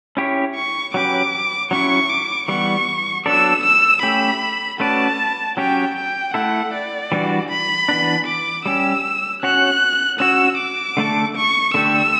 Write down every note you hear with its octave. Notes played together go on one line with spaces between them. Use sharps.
C#4 E4 G4 C#5
C#6
F#3 C#4 G4 B4 D6
F#3 C#4 E4 C#6
D6
E3 G3 B3 C#6
F#3 B3 D4 A4 D5 E6
E6
A3 C#4 G4 B5
A3 C#4 F#4 B4 D5 A5
F#3 C#4 G4 C#5 G5
G5
A3 E4 A4 F#5
D5
E3 G3 D4 F#4
B5
E3 B3 D4
D6
G3 C#4 G4 E6
C#4 F#4 C#5 F#6
C#4 F#4 C#5 E6
D6
D3 A3 D4 A4
C#6
D3 A3 D4 G4 E6